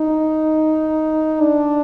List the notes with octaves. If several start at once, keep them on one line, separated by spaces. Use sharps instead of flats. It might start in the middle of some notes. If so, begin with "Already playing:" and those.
Already playing: D#4
D4